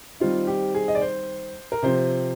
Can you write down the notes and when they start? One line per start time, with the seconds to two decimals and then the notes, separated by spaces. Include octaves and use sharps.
0.20 D#3 G3 C4 D#4 F4
0.47 G4
0.75 G#4
0.88 D#5
0.95 D5
1.01 C5
1.72 A#4
1.83 C3 F3 C4 C5